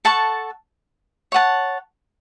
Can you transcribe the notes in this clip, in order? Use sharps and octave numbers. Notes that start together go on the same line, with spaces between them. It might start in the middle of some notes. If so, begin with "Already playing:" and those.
A4 F#5 A5 C#6
C#5 F#5 A5